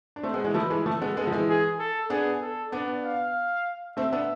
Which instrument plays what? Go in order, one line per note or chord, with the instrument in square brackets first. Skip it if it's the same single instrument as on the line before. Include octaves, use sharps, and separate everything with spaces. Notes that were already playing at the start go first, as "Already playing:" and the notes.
[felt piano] D4
[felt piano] A3 C4 [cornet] C5
[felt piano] G#3 B3
E3 G#3
[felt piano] F3 A3 [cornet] B4
[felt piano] E3 G#3
[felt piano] F3 A3 [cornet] A4
[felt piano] G#3 B3
G#3 B3
F3
E3 G#3
[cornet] G#4
A4
[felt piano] B3 D4 [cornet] G#4
[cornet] A4
[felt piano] B3 D4 [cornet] D5
[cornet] F5
[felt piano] A3 C4 [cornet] E5
[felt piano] B3 D4